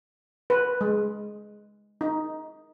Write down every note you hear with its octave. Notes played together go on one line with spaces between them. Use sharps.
B4
G#3
D#4